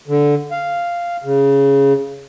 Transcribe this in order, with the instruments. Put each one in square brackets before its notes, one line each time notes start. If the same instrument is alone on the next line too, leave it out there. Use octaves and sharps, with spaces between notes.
[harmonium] D3
F5
C#3